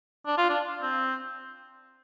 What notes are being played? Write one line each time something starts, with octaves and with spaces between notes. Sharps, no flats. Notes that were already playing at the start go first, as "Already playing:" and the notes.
D4
F4
D4
C4